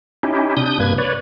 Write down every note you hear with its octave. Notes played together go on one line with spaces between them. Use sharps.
C#4 D#4 E4 G4
C3 D4 D#6 G6
G2 C3 A#3 B4 G#6
B4 C#5 D5